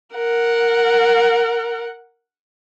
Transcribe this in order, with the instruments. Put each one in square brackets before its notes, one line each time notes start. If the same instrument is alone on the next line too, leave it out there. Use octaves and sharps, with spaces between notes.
[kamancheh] A#4 F#5